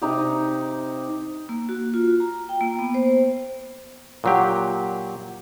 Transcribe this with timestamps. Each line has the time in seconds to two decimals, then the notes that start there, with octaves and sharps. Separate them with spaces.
0.02 C3 D#4 G4
1.49 A#3
1.69 F#4
1.94 F4
2.20 A#5
2.49 G5
2.61 A#3
2.79 B3
2.94 C5
4.24 A#2 F#3 G4